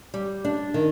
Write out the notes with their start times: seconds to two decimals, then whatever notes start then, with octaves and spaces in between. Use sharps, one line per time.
0.14 G3
0.45 D4
0.74 D#3